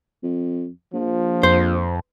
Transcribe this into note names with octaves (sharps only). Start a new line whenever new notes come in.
F2
A#1 F3
F2 C5